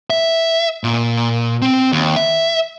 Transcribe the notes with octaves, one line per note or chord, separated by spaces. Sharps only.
E5
A#2
C4
D#2
E5